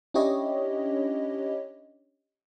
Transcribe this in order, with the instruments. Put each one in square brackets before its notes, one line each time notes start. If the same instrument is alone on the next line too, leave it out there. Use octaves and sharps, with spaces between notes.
[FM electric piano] C#4 D4 E4 G4 C#5 D#5